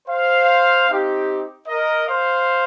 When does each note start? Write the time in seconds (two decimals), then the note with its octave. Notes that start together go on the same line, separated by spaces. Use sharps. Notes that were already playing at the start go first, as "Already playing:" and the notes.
0.08 C5 F5
0.88 C4 D#4 G4
1.67 A#4 D#5
2.07 C5 F5